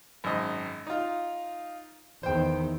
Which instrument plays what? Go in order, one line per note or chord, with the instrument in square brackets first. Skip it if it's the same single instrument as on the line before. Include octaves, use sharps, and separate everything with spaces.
[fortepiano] G#1 F#2 D#5
D#4 F4
[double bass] E2 D#3 [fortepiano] C5 G5